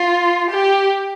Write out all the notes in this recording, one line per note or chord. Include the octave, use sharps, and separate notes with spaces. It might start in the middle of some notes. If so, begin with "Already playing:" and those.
Already playing: F4
G4